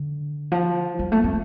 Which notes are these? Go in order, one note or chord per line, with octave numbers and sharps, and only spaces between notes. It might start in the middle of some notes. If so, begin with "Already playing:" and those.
Already playing: D3
F3
G3
A3
C4